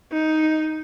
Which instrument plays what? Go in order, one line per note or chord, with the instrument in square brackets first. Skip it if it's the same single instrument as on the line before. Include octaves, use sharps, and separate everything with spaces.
[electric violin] D#4